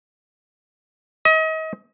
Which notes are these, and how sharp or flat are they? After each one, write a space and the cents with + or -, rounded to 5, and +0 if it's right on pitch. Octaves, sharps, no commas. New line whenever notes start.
D#5 +35